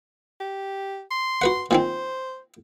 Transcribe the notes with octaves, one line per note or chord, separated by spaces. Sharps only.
G4
C6
F#4 B4 F#5
A#2 D#3 C4 C5